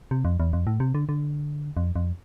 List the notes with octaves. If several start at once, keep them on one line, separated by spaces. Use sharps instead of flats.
C3
F2
E2
F2
A2
C3
D3
D3
F2
F2